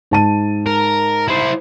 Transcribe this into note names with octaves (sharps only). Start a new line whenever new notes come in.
G#2 A5 D#7
A#4
E4 C5